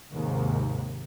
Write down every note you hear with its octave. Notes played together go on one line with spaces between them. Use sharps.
D#2 G#2 C3